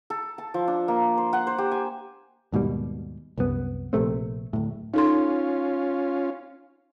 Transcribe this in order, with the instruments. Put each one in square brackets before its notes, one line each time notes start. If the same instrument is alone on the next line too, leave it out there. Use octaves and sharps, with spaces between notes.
[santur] A4
A5
F3
D4
A#3
C5
F#5
C5
G4
G#5
[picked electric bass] D#2 G#2 B2 G3
C2 F#2 B3
A#1 C3 A3 C4
D1 A2
[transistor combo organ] C#4 F4 [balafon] D#4 A4 C6